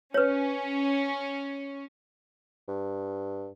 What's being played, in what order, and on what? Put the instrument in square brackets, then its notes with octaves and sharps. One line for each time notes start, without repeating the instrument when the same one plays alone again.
[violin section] C#4 [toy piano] B4 C#5
[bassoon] G2